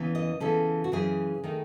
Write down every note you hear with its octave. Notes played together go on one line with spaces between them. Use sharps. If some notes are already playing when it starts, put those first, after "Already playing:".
Already playing: E2 C#3 E3 B3
D#5
C#3 E3 B3 A4
F#4
F#2 C#3 E3 G#4
D#3 A3 D#4